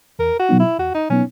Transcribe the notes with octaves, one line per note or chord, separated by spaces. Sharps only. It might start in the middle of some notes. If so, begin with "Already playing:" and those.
E2 A#4
F#4
B2 F#3 B3 D#4
E4
E2 F#4
D#4
B2 F#3 B3 C#4 D#4